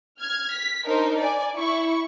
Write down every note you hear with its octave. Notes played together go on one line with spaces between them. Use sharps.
F6 G#6
B6
D4 D#4 A#4 C5
D5 G#5
E4 C#6